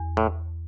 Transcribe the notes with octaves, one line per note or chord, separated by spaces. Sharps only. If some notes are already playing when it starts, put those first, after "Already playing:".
Already playing: E2
A2